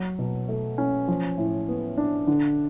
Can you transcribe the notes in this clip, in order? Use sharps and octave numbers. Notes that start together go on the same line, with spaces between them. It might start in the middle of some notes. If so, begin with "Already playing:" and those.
Already playing: F#3
B2
A3
C#4
F3
A2
B3
D4
D3